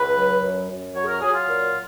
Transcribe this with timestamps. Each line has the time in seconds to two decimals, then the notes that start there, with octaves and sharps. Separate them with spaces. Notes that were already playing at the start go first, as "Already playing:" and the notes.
Already playing: C#2 B4
0.15 F#3
0.42 F#2
0.68 F#2
0.94 F#3 C#5
1.03 G#4
1.08 A#4
1.21 F#3 G#4
1.34 F4
1.48 A#2